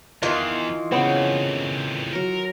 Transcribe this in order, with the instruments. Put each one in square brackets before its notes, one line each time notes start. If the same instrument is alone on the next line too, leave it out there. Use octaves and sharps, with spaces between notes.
[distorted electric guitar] E2 [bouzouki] D#3 E3 F4
[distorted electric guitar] A2 C4 [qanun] C#3 C#5 [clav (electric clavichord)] B3
[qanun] F#3 C6 [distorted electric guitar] A#4